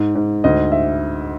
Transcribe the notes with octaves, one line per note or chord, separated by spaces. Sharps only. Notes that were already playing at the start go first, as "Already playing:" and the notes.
Already playing: G#2
G#2
D2 D#5
E5